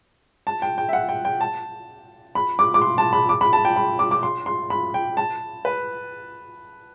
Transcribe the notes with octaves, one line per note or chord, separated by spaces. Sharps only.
A5
G5
G5
E5
F#5
G5
G5
A5
B5
D6
D6
C6
A5
B5
D6
B5
A5
G5
B5
D6
D6
C6
C6
B5
G5
A5
B4